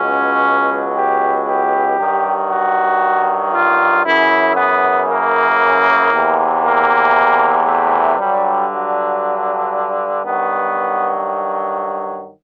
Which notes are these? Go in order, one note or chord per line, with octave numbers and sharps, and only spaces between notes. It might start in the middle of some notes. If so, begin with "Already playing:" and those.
Already playing: C#2 B2 F#3 C#4
G4
G4
G2 D#3 F#3
F#4
F4
F#2 C#3 E3 E4
B3
A#3
E2 C3 E3
A#3
A3
G2 D3 F#3 G3
F#3
G2 D#3 F#3 B3